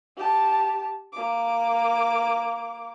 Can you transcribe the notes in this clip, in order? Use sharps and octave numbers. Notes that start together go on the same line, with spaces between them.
G4 A5
A#3 D6